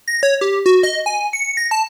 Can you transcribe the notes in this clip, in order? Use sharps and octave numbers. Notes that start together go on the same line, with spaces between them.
A#6
C#5
G4
F#4
D#5
G#5
C#7
A#6
A5